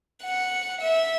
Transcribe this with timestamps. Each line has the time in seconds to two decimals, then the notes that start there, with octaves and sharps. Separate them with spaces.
0.23 F#5
0.81 E5